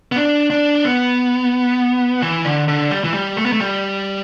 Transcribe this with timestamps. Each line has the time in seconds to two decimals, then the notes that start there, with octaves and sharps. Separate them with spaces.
0.12 B3
0.16 D4
0.50 D4
0.84 B3
2.22 E3
2.45 D3
2.68 D3
2.91 G3
3.04 E3
3.14 G3
3.37 A3
3.45 B3
3.53 A3
3.60 G3